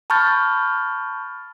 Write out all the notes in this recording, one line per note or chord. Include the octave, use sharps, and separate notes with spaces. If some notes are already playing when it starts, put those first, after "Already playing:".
A5 B5 C#6 F6 G6 A6